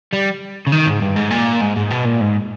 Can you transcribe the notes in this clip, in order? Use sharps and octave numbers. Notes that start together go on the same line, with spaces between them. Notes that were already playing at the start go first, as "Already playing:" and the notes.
G3
C#3
D#3
G#2
G2
G#2
A#2
G#2
G#2
B2
A#2
G#2